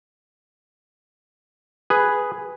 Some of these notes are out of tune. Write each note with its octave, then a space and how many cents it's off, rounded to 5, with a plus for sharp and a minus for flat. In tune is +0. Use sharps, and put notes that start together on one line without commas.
G#4 +0 B4 +0